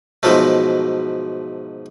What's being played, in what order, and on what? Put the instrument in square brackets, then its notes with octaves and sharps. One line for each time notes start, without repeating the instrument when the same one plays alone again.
[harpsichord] G#2 B2 F3 F#3 A3